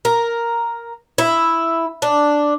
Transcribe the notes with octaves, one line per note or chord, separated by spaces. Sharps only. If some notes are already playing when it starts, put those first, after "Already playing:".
A#4
E4
D4